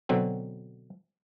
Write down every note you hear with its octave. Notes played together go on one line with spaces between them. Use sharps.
B2 D3 F#3 C4